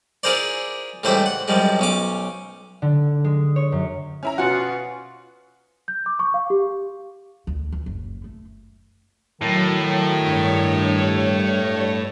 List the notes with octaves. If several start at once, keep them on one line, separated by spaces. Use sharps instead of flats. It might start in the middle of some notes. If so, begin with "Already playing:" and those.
E4 F4 G#4 A#4 C5 D5
C#2 A2 E3 G3 C5 E5
F#5
F#2 F3 G3 G#3
B1 C#4 D6
D3
G#3
C#5
F#2
C#4 E4 A#5
B2 C#4 F4 F#4 F#5
G6
D6
C#6
F5
G4
D2
E3
F#1
A3
A2 D#3 F#3
G2 C#5